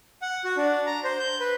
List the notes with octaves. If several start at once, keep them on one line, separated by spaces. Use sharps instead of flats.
F#5
F#4
D4
A#5
C5
G6
B4